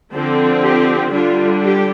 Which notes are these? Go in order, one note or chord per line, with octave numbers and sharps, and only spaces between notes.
D3 F3 C4 A4
G4
D3 G3 D4 F4
G4